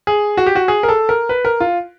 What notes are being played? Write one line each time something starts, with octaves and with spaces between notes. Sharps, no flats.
G#4
F#4
G4
F#4
G#4
A#4
A4
A#4
B4
A#4
F4